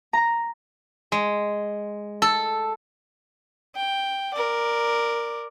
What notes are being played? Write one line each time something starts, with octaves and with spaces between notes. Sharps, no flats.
A#5
G#3
A4
G5
A#4 D5